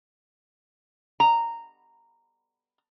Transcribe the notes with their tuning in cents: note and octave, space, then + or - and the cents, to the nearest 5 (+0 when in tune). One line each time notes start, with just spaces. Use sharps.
A#5 -10